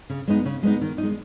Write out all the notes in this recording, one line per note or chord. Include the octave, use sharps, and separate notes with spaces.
C#3
G#3 B3 D#4
C#3
G#3 B3 D#4
D#3
G#3 D#4